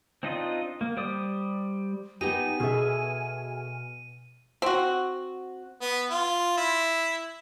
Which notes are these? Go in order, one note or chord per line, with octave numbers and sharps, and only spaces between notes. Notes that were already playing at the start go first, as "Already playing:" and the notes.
C4 D4 D#4 F4 D#5
A#3
G3 C5 D5 D#6
B3 D#4 G4 G#5 D#7
B2 G#4 A4 E5 F6
C4 F#4
B3
F4
E4